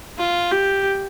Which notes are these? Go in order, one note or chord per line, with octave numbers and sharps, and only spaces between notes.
F4
G4